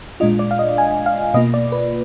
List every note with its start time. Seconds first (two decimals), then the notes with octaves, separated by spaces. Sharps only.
0.20 A#2 G#3 D4 F4 D#5
0.39 D5
0.51 F5
0.59 D#5
0.78 G#5
1.06 F5
1.34 B2 A#3 F4 D#5
1.54 D5
1.72 B4